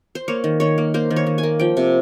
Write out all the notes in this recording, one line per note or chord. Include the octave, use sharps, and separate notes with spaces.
C5
A#3 C#5
D#3
D#3 C#5
A#3
A#3 C5
D#3
C#5
D#3
G#5
A#3
F3 G5
C3